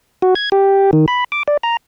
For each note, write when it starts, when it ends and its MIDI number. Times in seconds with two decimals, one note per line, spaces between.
0.22 0.34 66
0.35 0.50 92
0.52 0.91 67
0.93 1.06 51
1.08 1.24 83
1.32 1.43 86
1.48 1.57 74
1.63 1.77 82